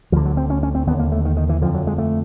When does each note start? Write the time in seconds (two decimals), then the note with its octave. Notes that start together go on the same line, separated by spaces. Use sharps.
0.12 D2 D3 F3
0.25 F#3
0.37 C4
0.50 C#4
0.63 C#4
0.75 C4
0.87 D#2 D3 B3
0.99 A#3
1.12 A3
1.25 D#3
1.37 D#3
1.49 E3
1.61 F2 D3 F3
1.74 F#3
1.87 G#3
1.98 A3